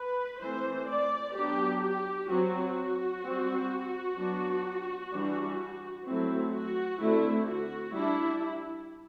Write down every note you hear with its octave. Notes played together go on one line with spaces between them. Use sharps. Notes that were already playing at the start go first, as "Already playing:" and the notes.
Already playing: B4
E3 A3 C4 C5
D5
F#3 B3 D4 G4
G4
F#3 C4 F#4
G3 C4
F#3 B3 D4
E3 G3 D4
F#3 A3 C4 E4
F#4
D3 A3 C4 E4
F#4
G3 D4 E4